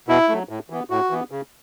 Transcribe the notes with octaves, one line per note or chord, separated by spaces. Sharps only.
B2 E4
F#3 A3
A2
E3 B3
A2 F#4
E3 B3
C#3